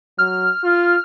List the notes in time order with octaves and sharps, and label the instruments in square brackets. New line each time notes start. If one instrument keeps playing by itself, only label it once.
[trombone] F#3 [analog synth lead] F6
[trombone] F4